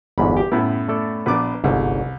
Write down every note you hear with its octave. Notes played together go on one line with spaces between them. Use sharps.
G1 E2 G#2 B5
G4
F#2 A2 B3 E4
A3 A4 D5
A#1 B3 B4 D5 D6
G1 C2 G#2